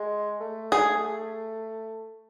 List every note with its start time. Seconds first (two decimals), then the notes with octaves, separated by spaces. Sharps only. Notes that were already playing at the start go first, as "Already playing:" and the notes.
Already playing: G#3
0.41 A3
0.72 G#4